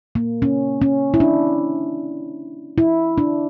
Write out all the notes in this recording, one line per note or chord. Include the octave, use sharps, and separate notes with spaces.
A#3
C#4
C#4
E4
D4
E4
D4